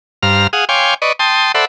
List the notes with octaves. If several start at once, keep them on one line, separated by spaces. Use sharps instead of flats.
G2 C5 F5 A#5 F6
G#4 F5 F#5 D#6
C#5 F5 G5 G#5 C6 D6
B4 D5 D#5 C#6
G5 A5 C6 D#6
A4 C5 D5 E5 F#5 B5